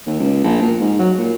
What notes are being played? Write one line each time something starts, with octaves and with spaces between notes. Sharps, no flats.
D#2
C#2
A#1
A#2
G#2
F#3
A#2